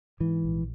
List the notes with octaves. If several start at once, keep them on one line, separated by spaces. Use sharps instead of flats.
G#2 E3
A#1